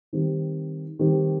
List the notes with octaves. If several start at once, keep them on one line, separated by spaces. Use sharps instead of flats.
D#3 G3 C4 G4
D#3 G3 C4 G4